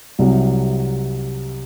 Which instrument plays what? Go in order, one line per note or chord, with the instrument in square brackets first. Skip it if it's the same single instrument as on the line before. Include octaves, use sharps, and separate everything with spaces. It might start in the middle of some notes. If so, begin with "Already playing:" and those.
[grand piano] C2 C3 F#3